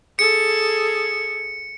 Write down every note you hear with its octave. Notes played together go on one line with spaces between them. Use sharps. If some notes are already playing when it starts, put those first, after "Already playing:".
G#4 A4 C#7